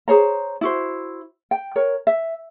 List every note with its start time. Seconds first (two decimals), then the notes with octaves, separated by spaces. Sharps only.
0.08 G#4 C5 C#5 A#5
0.61 E4 F#4 C5
1.51 G5
1.76 A#4 C#5
2.07 E5